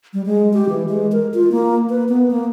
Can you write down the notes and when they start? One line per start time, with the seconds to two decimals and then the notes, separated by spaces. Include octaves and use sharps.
0.13 G3
0.26 G#3
0.53 G4
0.69 E3
0.89 G#3
1.12 A#4
1.34 F4
1.52 A#3
1.90 B4
2.09 B3
2.31 A#3